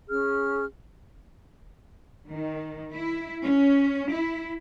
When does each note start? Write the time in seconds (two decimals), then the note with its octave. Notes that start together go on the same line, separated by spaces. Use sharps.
0.10 C#4 G#4 F6
2.30 D#3
2.93 E4
3.43 C#4
4.12 E4